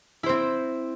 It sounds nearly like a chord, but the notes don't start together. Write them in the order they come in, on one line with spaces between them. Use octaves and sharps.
E4 C5 C4